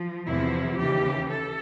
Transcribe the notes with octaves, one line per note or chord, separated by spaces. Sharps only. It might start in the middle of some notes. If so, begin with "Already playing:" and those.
Already playing: F3
E2 C3 F3 E4
D#2 C#3 E3 G4
A4